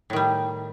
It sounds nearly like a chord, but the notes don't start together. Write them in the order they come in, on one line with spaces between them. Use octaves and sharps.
A2 D#3 G3